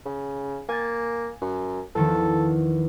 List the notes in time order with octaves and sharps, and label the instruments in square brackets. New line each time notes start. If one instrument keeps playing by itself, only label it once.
[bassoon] C#3
[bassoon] A#3 [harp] G#5 A6
[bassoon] F#2
[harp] E2 D#3 F3 [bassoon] A4